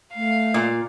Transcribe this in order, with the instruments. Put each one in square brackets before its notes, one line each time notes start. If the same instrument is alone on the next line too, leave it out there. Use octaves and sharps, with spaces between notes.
[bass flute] A3 [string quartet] F5
[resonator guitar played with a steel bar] A#2